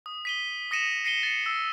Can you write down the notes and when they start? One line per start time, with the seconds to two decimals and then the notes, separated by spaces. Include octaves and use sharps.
0.06 D#6
0.25 B6 D#7 G7
0.71 D#6 A#6 C#7 D#7 E7
1.05 A#6 C7 C#7 D#7 G7
1.23 A6 C#7
1.46 E6